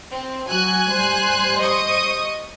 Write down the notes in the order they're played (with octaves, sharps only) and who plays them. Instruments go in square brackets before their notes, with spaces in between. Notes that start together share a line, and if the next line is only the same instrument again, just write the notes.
[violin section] C4
[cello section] F#3 F#4 [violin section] G#5 F#6
[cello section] G3 C5
[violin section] D#5 C#6 D#6